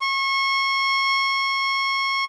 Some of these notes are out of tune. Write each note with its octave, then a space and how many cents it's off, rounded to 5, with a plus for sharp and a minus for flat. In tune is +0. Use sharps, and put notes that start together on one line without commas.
C#6 -30